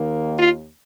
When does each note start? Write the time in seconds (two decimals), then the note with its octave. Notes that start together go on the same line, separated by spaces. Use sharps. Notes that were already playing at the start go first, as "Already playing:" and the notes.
Already playing: D#2 D#3 A#3
0.38 F4